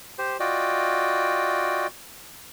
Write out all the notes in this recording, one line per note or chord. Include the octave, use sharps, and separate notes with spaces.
G4 C5
F4 F#4 D5 D#5 G5